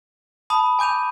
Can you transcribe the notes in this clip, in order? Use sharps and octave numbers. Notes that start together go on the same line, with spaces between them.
A5 B5 D#6
G#5 D6 G6 D#7 F7